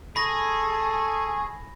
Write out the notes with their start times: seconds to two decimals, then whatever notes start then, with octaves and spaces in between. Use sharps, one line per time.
0.16 G#4 A4 B5 C#6 A#6